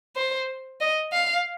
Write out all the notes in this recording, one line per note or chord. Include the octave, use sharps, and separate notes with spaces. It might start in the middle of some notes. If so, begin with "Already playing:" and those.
C5
D#5
F5